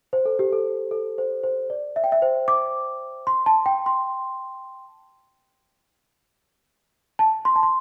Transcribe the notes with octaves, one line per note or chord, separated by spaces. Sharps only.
C5
A4
G4
A4
A4
C5
C5
D5
E5
G5
E5
C5
D6
C6
A5
G5
C6
A5
C6
A5
C6